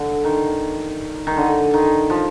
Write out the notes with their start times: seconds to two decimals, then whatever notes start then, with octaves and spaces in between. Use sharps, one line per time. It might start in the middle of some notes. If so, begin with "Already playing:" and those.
Already playing: D3
0.25 D#3
1.27 D#3
1.37 D3
1.74 D#3
2.10 F3